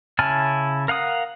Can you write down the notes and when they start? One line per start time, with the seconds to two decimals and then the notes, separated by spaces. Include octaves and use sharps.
0.19 C#3 E4 G#5 A5 F6
0.88 A#4 F5 F#5 D#6